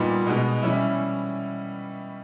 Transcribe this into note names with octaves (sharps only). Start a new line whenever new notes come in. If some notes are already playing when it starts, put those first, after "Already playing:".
Already playing: A#2 G3 B3 D#4
B2 G#3 B3 D#4
E3 G3 C#4 E4